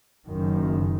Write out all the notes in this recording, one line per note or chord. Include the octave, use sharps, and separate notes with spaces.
F#1 F#2 D#3